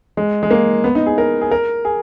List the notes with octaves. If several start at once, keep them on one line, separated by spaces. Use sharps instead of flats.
G#3
G#3
A#3
B3
D#4
G#4
A#4
G#4
A#4
G#4